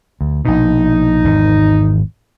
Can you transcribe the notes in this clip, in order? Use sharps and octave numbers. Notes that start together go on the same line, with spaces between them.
D2
A#1 B2 D#4
G#1 E2 G#2